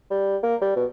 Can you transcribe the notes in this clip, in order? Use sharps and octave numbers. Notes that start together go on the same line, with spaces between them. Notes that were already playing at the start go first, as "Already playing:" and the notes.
G3
A#3
G3
B2